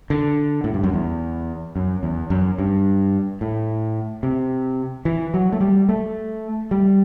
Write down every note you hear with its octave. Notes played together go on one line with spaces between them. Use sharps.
D3
A2
G2
F#2
E2
F#2
E2
F#2
G2
A2
C3
E3
F#3
A3
G3
A3
G3